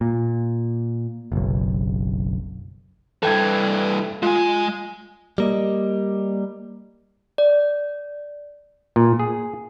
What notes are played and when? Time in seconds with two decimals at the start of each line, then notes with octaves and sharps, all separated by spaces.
0.01 A#2
1.32 F#1 B1
3.23 G2 E3 A4 G5 G#6
4.23 G#3 F4 G#5
5.38 G3 A#3 D#5
7.38 D5
8.96 A#2
9.19 G#4